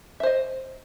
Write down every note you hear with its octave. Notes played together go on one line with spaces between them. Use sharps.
C5 D#5 E5